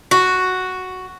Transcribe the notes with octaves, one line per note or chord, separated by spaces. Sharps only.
F#4